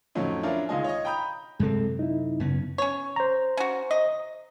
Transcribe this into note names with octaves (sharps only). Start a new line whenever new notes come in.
F2 A2 F#3 A3 C#4 D#4
C#4 D4 E4 F4 A#4
C#2 D#3 G#3 D#5 G#5
C#5 D#5
G5 A#5 B5 D#6 G6
F#2 C3 G#3 C4 A4
D#4 E4
F#2 C#3 B3 C#4
C#4 C#5
C5 A#5
C#4 F#4
D#5